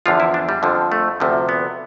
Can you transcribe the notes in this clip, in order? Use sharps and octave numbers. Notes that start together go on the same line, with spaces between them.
E2 D3 F3 F4
E4
D4
G3
F2 D3 F3
A3
D2 C3 F3
B3